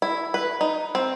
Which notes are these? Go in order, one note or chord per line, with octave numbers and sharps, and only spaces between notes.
E4
B4
D#4
C4